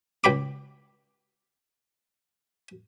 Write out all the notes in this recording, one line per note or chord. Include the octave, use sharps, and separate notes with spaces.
C#2 G5 B5 D6